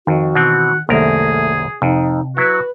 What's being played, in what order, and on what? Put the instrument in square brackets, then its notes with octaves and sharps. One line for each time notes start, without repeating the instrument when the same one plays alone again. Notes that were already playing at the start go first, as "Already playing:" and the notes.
[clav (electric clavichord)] F2 [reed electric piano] D#3 [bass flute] F#4
[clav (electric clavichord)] B2 E3 C4 [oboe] F#5
[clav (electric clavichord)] C2 F#2 A#4 [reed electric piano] D#3 A#3 [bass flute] A3 [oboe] G#4
[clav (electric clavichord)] F2 [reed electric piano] C3 [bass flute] D#4
[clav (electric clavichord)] F#3 E4 [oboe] F#4 [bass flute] B4